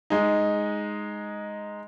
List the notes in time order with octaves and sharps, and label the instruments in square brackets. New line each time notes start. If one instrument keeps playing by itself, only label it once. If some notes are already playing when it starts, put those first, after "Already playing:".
[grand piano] G#3 D#4